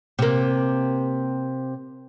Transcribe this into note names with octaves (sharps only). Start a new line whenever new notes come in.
C3 A#3